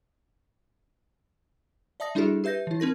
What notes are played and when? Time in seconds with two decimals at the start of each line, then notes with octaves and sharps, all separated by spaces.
2.00 D5 E5 A5 D#6 A#6
2.15 G3 D4 E4 F#4 G#4 A4
2.44 G4 B4 E5 G6 A#6
2.67 E3 E4
2.80 C4 D#4 A#4 A#6